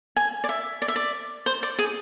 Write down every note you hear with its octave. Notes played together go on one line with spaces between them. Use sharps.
G#5
D5
E5
D5
E5
D5
C5
D5
G#4